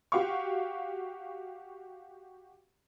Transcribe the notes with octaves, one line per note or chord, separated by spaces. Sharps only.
F#4 G4 F5 C#6